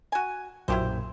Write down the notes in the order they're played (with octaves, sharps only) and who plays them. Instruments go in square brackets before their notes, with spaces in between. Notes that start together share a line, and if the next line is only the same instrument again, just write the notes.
[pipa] F#4 G#5
[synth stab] B1 F#2 A#2 [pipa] E4 G4 C5